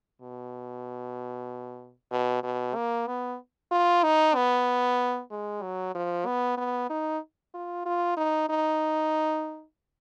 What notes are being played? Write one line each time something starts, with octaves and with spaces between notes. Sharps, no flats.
B2
B2
B2
A#3
B3
F4
D#4
B3
G#3
F#3
F3
B3
B3
D#4
F4
F4
D#4
D#4